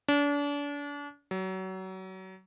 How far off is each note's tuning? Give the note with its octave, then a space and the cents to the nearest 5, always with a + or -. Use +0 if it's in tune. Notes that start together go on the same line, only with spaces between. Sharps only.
D4 -35
F#3 +30